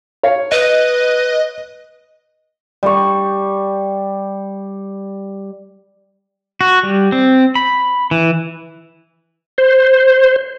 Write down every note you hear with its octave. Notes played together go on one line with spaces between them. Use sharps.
C#5 F5
B4 D#5
G3 C#6
F#4
G3
C4
B5
E3
C5